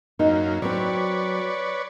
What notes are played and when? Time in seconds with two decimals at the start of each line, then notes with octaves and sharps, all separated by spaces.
0.19 F#2 A#3 D#4
0.62 F#3 C4 B4 C#5 D5